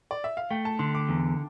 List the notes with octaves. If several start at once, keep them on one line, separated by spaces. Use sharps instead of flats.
D5
E5
F5
A3 G5
A5
D3 C6
D6
E2